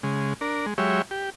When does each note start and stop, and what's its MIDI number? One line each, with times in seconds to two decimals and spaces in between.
0.03 0.34 49
0.03 0.34 56
0.41 0.66 62
0.41 0.66 70
0.66 0.74 56
0.78 1.02 54
0.78 1.02 56
0.78 1.02 67
0.78 1.02 73
0.78 1.02 76
1.11 1.30 67